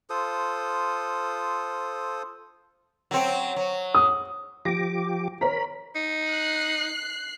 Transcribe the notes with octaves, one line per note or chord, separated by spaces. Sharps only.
F4 A4 C5 D#6
F#3 C4
F#3
D#6
F3 G4 D6 A#6
A#4 C#5 A#5 B5
D#4
F#6 C7